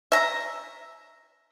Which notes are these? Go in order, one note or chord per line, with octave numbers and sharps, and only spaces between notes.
E5 A#5